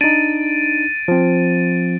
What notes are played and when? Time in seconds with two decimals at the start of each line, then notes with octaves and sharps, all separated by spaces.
0.01 D4 D#4 A6 D7 D#7
1.08 F3 C4